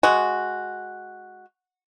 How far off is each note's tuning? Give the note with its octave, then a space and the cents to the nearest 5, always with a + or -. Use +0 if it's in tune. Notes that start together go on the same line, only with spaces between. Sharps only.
G#3 +0 F#4 +0